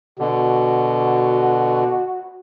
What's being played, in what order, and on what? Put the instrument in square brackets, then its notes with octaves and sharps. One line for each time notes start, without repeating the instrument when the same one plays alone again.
[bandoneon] B2 D3 [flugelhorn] F#4